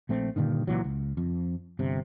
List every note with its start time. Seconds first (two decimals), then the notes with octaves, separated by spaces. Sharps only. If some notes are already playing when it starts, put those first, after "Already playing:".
0.09 A#1 A3 C4
0.36 G2 A#2 D3 D#3
0.67 C#2 A#2 E3 F#3
0.84 C#2
1.17 F2
1.79 G1 C3